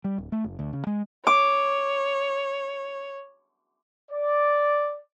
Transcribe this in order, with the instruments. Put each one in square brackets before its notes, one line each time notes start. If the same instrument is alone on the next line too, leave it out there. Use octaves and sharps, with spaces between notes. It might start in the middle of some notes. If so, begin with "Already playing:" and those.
[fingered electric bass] G3
D1
A3
F#1
D2
C#3
G#3
[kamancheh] C#5 [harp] D6
[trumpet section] D5